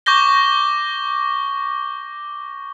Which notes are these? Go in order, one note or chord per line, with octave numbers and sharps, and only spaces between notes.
C#6 D6 G6 A#6 G7